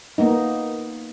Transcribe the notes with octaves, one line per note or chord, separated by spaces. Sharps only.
A#3 B3 D#4